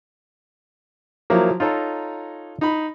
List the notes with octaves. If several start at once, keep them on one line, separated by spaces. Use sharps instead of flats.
F3 F#3 A#3 E4
D#4 F4 A4 C#5 A#5
D#4 B5